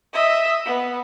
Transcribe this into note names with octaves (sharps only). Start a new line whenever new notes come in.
D#5 E5
B3